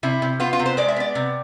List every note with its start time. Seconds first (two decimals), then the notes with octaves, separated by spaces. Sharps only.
0.03 C3 E4
0.22 C3
0.40 B3 F4
0.53 F4
0.59 C3
0.66 C5
0.77 G#3 D5
0.88 E5
0.96 B3 D5
1.15 C3